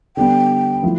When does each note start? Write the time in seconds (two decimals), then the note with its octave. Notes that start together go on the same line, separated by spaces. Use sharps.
0.17 D3 G3 B3 G5
0.83 F3 A3 E4 A4